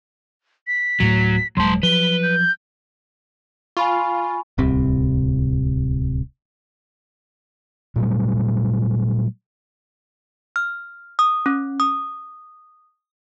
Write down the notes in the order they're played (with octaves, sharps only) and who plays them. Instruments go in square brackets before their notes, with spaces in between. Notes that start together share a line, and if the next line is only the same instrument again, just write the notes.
[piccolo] B6
[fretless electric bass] D1 A2 A3 [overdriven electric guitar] F#3
[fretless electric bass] D#1 C3 G#3 [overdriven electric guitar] F#3 A5 [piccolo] C6
[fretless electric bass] F3 F#3 [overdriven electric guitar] B4 [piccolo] G7
[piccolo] G6
[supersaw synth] F4 [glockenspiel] G#5 B5 C#6
[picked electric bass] D1 C2 C3
[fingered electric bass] A#2 F#3 G3 A3
[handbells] F6
D#6
C#4
D#6